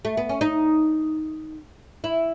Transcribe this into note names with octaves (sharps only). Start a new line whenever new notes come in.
A3
B3
C#4
D#4
E4